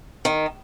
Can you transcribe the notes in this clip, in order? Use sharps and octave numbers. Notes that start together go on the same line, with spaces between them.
D#3